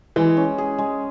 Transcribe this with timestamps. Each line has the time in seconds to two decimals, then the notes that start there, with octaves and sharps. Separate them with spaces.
0.16 E3 G#3
0.37 C#4
0.58 G#4
0.78 G#3